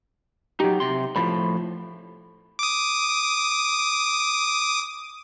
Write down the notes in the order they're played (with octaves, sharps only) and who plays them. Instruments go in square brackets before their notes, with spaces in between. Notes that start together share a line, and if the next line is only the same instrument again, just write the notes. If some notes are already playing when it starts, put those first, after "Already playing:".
[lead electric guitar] F#3 D#4 [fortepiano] G4
[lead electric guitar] C3 C6
[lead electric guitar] A2 F3 [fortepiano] B5
[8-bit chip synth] D6 D#6